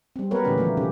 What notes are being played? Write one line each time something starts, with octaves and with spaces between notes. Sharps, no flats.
G3 C4
F#3 A#3 B3 A#4 B4 C#5
A#2 D3 E3 A3 C#4 G4
D#3 F3 A3 A#3
C3 C#4 G4